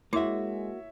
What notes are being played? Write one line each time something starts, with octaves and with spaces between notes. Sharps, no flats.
G#3 A#3 E4 F#4 C#5 E5 D6